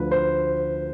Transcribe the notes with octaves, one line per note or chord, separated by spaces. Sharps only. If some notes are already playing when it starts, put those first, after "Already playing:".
Already playing: D2 D3 F3 B4
C5